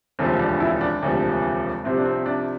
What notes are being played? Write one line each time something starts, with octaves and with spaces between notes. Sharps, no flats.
E1 D2 C3 F3 C4
D4
E4
D4
E1 D2 C3 F3
C2 C3 F3 C4
D4
C4
D4